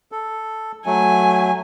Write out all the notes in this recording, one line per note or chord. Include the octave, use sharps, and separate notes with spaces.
A4
F#3 A3 G#5